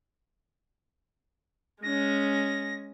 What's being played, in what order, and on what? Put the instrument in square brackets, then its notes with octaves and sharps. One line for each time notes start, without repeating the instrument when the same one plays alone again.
[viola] G#3 C#4 [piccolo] A#6